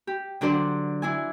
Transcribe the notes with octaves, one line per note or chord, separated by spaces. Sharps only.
G4
D3 F#3 D4 A4 C5 D5
D4 E4 G#5